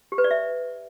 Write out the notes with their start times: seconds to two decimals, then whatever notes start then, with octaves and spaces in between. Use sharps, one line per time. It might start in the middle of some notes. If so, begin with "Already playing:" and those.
0.12 G4
0.18 B4
0.24 D5
0.31 E5